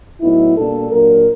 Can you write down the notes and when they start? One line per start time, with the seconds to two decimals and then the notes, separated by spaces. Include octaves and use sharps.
0.21 A2 F#3 B3 D#4 E4
0.56 B2 G3 A#3 D4 A4
0.91 A#2 F#3 A#3 D4 A#4